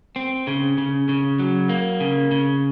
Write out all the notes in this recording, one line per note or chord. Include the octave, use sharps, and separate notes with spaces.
C4
C#3
C#3
C#3
F#3
A#3
C#3
C#3